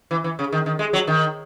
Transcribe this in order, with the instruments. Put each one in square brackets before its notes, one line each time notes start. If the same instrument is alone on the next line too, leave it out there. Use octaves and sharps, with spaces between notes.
[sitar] E3
E3
C#3
D#3
D#3
G#3
F#3
D#3